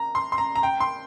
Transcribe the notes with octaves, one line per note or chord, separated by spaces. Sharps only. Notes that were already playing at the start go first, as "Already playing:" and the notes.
Already playing: A#5
C6
C6
A#5
A#5
G5
C6